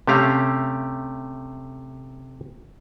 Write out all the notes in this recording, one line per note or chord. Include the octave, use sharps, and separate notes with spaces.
C3 A3 C#4 G4 F5 A#5